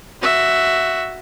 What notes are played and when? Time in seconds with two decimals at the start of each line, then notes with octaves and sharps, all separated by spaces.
0.22 F#4 E5